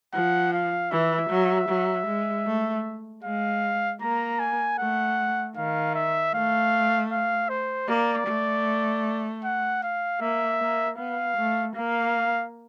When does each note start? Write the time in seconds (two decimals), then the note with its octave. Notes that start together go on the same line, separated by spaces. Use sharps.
0.13 F3 F#5
0.53 F5
0.91 E3 E5
1.30 F#3
1.69 F#3
2.07 G#3
2.46 A3
3.24 G#3 F5
4.02 A#3 A#5
4.39 G#5
4.79 A3 F#5
5.56 D#3 F5
5.95 E5
6.34 A3 F5
7.12 F5
7.49 C5
7.88 A#3 D5
8.27 A3
9.44 F#5
9.83 F5
10.20 A#3 E5
10.60 A#3
10.98 B3 F5
11.37 A3
11.76 A#3 F5